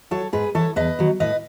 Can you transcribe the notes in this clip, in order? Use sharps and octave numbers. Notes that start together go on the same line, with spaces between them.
F#3 A4 C#5
G#2 G#4 B4
E3 A4 C#5
E2 B4 D#5
D#3 F#3
A2 B4 D#5